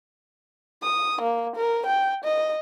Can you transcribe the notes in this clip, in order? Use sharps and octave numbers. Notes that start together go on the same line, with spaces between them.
D#6
A#3
A#4
G5
D#5